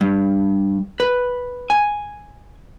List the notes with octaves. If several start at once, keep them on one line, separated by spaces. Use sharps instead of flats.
G2
B4
G#5